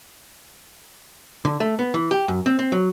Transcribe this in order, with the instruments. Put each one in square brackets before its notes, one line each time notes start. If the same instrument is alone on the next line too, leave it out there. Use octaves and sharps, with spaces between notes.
[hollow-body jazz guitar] D3
A3
B3
E3
G4
F#2
C4
C4
F#3